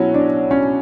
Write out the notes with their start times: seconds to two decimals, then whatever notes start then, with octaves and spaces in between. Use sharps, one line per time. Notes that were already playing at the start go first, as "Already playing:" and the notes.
Already playing: B2 F#3 C#4 E4 F#4
0.14 D4
0.51 C#4